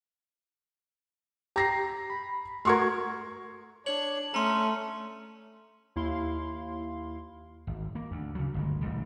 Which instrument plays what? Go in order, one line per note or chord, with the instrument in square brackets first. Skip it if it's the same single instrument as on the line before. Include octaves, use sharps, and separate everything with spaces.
[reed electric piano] G4 [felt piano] A#5 A#6 C7
[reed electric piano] B5
[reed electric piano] A3 F#4 A#4 [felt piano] C6 C#6 G#6
[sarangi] D4 [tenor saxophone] C#5 [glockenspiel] F#7
[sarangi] A3 [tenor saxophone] C#4 [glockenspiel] A#5 C6
[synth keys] D#2 E4 F5 C6
[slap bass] G#1
A#3
D2
C#3 F#3
G1 D2 G#3
D#1 A1 G#2 C#3